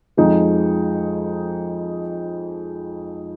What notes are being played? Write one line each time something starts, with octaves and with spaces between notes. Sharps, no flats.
F2 F3 G#3 D#4